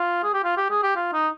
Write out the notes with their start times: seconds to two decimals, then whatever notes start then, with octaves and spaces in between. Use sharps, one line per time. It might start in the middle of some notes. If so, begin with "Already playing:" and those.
Already playing: F4
0.23 G#4
0.33 G4
0.44 F4
0.57 G4
0.70 G#4
0.83 G4
0.96 F4
1.13 D#4